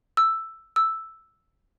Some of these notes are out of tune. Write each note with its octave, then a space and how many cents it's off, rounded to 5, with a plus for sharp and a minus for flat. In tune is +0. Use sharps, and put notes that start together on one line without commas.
E6 +5
E6 +0